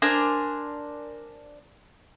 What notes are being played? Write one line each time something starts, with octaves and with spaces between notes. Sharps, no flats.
D4 A#4 C5 G#5